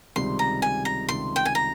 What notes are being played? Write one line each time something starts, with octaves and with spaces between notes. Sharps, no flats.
C#2 C3 D#3 G3 C6
A#5
G#5
A#5
C#2 C3 D#3 G3 C6
G5
G#5
A#5